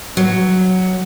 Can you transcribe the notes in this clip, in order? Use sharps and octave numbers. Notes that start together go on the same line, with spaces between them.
F#3